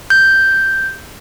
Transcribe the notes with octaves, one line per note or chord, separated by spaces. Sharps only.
G6